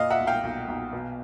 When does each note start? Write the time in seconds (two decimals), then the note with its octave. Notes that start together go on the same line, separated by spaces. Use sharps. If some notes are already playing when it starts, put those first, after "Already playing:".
Already playing: A#2 D#5 F5
0.10 E5 F#5
0.19 B1
0.27 F5 G5
0.43 B1
0.68 B1
0.93 B2